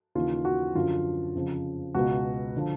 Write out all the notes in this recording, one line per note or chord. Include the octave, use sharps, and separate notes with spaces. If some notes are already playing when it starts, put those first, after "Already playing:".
D#2 C#3 E3 F4
F#4
F#2 D3 F3 F4
F2 C#3 F3
C#2 B2 F#4
D3 F3